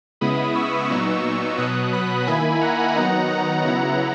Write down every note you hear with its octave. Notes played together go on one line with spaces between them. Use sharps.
C#3 G#3 B3 E4 B5 D#6
C#6 E6
A#2 F#3 B3 D#4
B2 F#3 B3 D#6 F#6
B5 D#6
D#3 A#3 E4 G#5 B5
F#5 A#5
D#3 F#3 B3 D#4
F#5 A#5
C#3 F#3 B3 E4